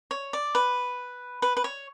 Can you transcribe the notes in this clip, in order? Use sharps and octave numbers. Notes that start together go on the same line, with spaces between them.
C#5
D5
B4
B4
B4
C#5